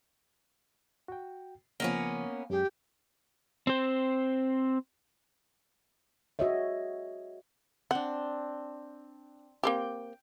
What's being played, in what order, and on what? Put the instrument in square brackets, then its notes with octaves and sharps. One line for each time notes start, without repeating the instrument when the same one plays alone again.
[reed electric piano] F#4 G5
[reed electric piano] C#3 F3 [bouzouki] A#3 B3 C#4
[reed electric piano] F#2 G#3 G#4 [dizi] G4
[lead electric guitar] C4 C5
[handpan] F#4 G#4 C#5 D#5 E5
[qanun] C4 D4 [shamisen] F#5
[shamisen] A#3 C4 G4 [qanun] G5